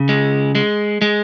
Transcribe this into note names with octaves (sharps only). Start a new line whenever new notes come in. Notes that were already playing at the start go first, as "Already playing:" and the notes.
Already playing: C#3
G#3
G#3
G#3